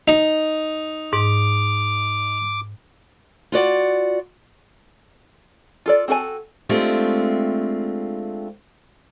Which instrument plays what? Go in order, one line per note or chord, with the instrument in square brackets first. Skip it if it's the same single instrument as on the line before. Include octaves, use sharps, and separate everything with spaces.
[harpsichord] D#4
[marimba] G#2 [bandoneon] D6
[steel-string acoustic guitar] F4 F#4 D5 F#5
[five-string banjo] F4 A4 D5
C4 F#4 A4 B4 G#5
[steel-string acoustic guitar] G#3 A3 C4 D4 F4 G4